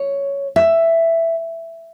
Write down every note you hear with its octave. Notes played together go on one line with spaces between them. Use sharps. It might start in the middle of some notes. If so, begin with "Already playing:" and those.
Already playing: C#5
E5